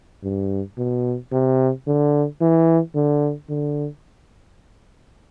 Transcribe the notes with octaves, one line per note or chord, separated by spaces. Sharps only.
G2
B2
C3
D3
E3
D3
D3